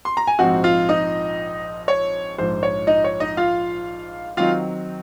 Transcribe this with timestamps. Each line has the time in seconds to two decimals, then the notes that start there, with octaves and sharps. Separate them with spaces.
0.05 C6
0.17 A#5
0.27 G#5
0.39 A#1 G#2 F3 C4 D#4 F#4 F#5
0.64 F4 F5
0.89 D#4 D#5
1.88 C#5
2.38 A#1 G#2 F3 C5
2.63 C#5
2.87 D#4 D#5
3.04 C#5
3.20 D#4 D#5
3.37 F4 F5
4.37 D#3 F#3 C4 D#4 F4 F5